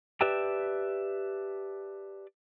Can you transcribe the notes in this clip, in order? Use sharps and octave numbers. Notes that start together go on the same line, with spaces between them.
G4 B4 D5 E5 G5 A5